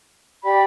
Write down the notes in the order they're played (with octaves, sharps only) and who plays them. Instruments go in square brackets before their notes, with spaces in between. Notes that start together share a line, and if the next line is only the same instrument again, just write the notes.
[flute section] G4 D5 G5 B5